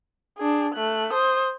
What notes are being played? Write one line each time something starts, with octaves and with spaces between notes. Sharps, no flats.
D4 G#4
A3 F#6
C5 D#6